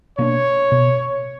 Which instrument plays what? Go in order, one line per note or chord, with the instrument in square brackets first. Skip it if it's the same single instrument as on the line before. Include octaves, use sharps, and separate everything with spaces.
[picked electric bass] B2 A#3 D4 [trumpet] C#5
[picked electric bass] B2